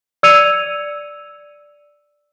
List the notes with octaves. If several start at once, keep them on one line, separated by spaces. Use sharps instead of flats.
D5 E6 G#6 C#7 D#7 F7